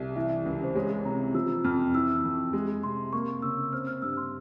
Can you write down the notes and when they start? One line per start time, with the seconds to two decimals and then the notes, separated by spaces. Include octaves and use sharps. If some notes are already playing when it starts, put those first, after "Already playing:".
Already playing: C2
0.16 E3 E5
0.46 C#2
0.64 C5
0.75 G#3 C#5
1.05 C3 A#5
1.34 F3 E6
1.64 F2 F6
1.94 E3 E6
2.24 F2
2.53 G#3
2.83 C3 C6
3.13 A#3 C#6
3.42 C#3 E6
3.73 C4 F6
3.87 F6
4.02 G2 E6
4.17 C6